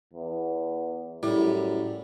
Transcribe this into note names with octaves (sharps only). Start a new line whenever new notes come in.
E2
F#2 A2 G3 E4